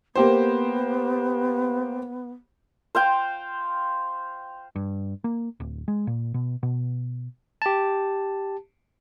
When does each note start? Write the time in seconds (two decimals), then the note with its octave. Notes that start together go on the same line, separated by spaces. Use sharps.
0.16 A#3 B3 G4 C5
2.95 C5 F5 G5
4.76 G2
5.24 A#3
5.60 D1
5.88 G#3
6.07 A#2
6.34 B2
6.63 B2
7.62 G4 A5